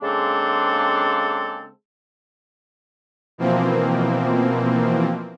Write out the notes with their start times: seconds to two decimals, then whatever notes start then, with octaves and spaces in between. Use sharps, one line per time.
0.02 C#3 G#3 A#3 C4 D4 A4
3.38 B2 E3 F3 A#3 C4